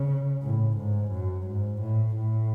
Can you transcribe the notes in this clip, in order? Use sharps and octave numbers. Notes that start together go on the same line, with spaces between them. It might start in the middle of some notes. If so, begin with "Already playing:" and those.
Already playing: C#3
A2
G#2
F#2
G#2
A2
A2